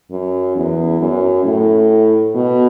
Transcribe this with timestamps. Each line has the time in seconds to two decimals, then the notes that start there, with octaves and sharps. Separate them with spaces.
0.11 F#2
0.56 E2
1.01 F#2
1.45 A2
2.35 B2